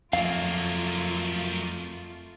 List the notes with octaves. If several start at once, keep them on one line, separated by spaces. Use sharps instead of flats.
F2 F#3 A3 A#3 F4 F5